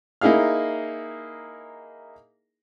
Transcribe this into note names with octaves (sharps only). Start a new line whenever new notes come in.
A#3 D#4 E4 G#4 F5 F6